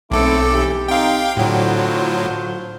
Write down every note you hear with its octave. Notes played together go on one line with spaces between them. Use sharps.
B1 G#3 A3 C4 E4 A4 D6
E3 G4
C4 D#4 F5 G5
A2 D3 F#3 F4 F#4 C5